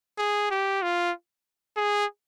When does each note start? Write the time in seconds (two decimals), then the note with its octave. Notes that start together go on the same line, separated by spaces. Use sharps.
0.18 G#4
0.51 G4
0.82 F4
1.77 G#4